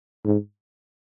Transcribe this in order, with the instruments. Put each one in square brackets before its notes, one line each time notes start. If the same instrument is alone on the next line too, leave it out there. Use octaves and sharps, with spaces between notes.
[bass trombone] G#2